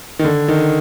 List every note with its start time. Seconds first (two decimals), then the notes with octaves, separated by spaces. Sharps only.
0.19 D#3
0.25 D3
0.48 D#3